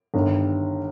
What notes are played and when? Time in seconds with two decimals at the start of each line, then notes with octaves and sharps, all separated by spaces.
0.14 G1 G2 D#3